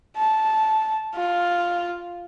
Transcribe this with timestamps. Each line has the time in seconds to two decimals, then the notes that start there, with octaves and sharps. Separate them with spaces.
0.17 A5
1.15 F4